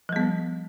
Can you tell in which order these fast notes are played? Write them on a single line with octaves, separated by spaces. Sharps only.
F3 G3 B3